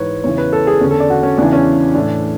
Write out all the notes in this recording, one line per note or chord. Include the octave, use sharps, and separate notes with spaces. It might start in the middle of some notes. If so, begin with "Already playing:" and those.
Already playing: G#2 E3 B4 C#5
E2 C#3 E3 C#5
B4
A4
G#4
E2 D3 C#4
A4
D5
F#4
C#4
E2 C#3 E3 D4
C#4
A2 E3 D4